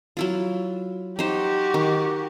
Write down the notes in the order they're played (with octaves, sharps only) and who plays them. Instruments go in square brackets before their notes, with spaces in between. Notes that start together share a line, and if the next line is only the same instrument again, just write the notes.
[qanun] F#3 E4 F4
[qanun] D#4 C5 [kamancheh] F#4 G4
[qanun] D#3